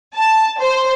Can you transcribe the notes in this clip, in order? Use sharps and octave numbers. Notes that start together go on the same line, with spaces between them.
A5
C5